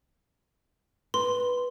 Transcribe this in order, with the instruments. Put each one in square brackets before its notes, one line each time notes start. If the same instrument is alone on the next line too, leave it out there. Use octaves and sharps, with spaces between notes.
[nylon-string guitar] B4 [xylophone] C6